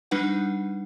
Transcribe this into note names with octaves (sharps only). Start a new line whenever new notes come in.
G3 D4 D#4 B4 F#5